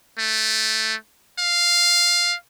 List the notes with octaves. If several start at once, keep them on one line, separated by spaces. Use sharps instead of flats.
A3
F5